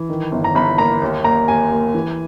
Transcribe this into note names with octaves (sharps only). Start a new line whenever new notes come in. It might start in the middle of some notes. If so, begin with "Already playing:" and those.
Already playing: E3
D#3
G1
A#5
G1 B5
A#3 A#5
D#2
A#3 A#5
D#2 G#5
A#3
E3